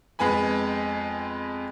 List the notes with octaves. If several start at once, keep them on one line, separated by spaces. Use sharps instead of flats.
F2 G#3 B3 G#5 B5